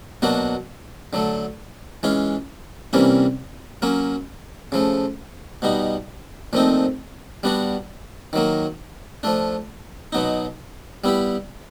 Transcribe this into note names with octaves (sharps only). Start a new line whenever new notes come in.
B2 F#3 A#3 D4 F#4
D3 F#3 A3
E3 G#3 C#4 F4
C3 E3 G3 A#3 C#4
F#3 A#3 C#4
C#3 F3 A3
B2 G3 B3 D#4
A#2 F3 A3 C4 D#4
G3 B3 D4 F#4
D#3 F#3 A#3
F3 A3 D4
B2 F#3 B3 D#4
G3 B3 E4 G4